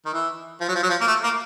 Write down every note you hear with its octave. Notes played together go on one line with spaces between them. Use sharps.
D#3
E3
F3
F#3
F3
F#3
F3
A#3
A3
A#3